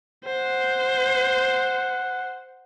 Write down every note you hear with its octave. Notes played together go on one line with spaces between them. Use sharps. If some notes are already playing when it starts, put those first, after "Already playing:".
C5 F#5